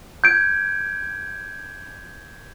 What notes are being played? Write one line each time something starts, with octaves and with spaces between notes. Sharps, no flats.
G6 G#6 D7